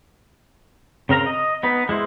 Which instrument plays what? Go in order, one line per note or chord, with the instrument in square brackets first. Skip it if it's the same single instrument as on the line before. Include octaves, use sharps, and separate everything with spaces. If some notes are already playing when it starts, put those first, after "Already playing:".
[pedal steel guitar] C#3 C4 A#4 A#5
D#5
B3 D#4 B4
G#3 E4 C5